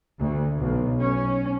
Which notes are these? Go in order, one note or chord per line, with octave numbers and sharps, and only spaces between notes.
D2
B1
C#4